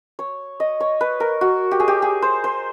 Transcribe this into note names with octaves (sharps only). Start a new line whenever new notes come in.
C#5
D#5
C#5
B4
A#4
F#4
G4
G#4
G4
G#4
C5
C5